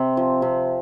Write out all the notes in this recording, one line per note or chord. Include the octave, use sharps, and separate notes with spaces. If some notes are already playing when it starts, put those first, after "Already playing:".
Already playing: C3 C4
F3
C3